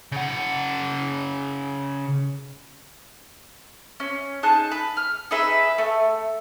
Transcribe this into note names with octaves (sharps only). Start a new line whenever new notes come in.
C#3 F#5
C#4
D#4 G#4 A5 F#6
B4
F6
D#4 G#4 B4 E5
A3